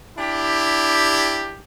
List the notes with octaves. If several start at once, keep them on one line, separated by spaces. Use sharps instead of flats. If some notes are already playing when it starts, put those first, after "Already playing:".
D4 E4 G4